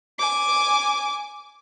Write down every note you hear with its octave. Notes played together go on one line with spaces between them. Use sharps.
G#5 D6